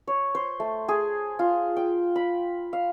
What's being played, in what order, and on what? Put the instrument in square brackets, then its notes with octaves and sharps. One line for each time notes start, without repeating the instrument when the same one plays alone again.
[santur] C#5
C5
A3
G#4
F4
G5
B5
F5